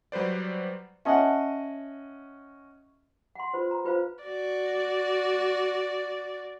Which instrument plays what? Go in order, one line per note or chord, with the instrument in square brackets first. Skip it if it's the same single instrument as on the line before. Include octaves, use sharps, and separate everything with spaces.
[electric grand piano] F#3 G3 B4 C5 D5
[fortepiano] C#4 D#5 F#5 [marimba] E5 G#5 A5
[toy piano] F#5 C6
F4 B4 C5
A#5
F4 B4 C5 F5
[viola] F#4 D5